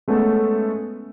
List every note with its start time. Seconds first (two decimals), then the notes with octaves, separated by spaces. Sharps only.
0.08 G#3 A3 B3 C#4 A4